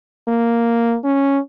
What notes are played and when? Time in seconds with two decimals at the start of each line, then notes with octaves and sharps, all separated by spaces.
0.28 A#3
1.04 C#4